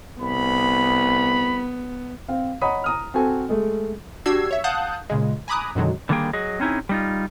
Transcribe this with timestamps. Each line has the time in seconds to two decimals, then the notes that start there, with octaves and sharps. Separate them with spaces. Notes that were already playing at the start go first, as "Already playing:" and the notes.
0.21 C2 B3 B5
2.28 C4 F5
2.61 C#5 D#5 F#5 A#5 B5 D#6
2.84 A#5 D#6 F6
3.14 C4 F#4 A4 G#5
3.49 G#3 A3
4.26 D4 F#4 G4 E6 G#6 C7
4.51 C#5 E5
4.64 F5 F#5 A5 D#6 F#6 G6
5.10 A#2 C#3 G#3
5.48 G#5 A#5 B5 D6 D#6 F#6
5.75 F#2 B2 D3 D#3 F#3 G#3
6.09 D3 D#3 G3 A#3 G#4 G5
6.33 F#3 G#4 D#5
6.60 C4 C#4 D#4 E4 G#4
6.89 G3 D#4 F4